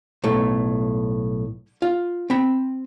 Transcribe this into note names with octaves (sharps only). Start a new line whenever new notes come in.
B1 A2 A3
F4
C4 B5